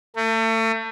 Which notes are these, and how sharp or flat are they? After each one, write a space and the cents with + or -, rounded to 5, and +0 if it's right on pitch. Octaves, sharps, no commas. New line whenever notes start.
A3 +35